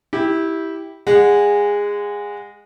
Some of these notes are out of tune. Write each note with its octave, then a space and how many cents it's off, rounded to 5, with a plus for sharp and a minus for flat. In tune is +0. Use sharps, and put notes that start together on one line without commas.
E4 -15 G4 +0
G#3 -20 F#5 -20